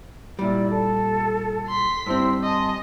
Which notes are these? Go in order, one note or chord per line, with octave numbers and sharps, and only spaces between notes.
A#2 G3 E4 D5
A4
C6 B6
G2 C4 E4 C5 E6
D#5 G#5 A5 C6